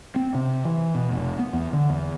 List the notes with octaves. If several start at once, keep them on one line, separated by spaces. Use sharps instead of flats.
C4
C3
E3
B2
F1
B3
E2
D3
E2